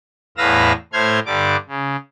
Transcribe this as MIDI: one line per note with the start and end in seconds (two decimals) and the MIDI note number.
0.37 0.73 40
0.37 0.73 45
0.37 0.73 71
0.37 0.73 77
0.37 0.73 88
0.37 0.73 94
0.93 1.20 45
0.93 1.20 57
0.93 1.20 72
0.93 1.20 84
0.93 1.20 89
0.93 1.20 92
1.26 1.56 43
1.26 1.56 50
1.26 1.56 55
1.26 1.56 86
1.68 1.96 49